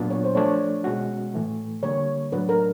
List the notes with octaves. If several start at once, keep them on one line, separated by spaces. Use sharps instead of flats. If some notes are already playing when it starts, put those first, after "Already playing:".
Already playing: A#2 F#3 B3 D4 F4
C#5
C5
F3 A3 D4 C#5
B2 G#3 C#4 F#4
A2 E3 A3
D3 G3 A#3 C#5
A2 F#3 A3 D4 B4
A#4